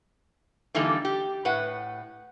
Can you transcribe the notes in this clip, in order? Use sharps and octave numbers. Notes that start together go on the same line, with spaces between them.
D3 E3 G3 A#3 D#4 A4
G4
A2 B4 F#5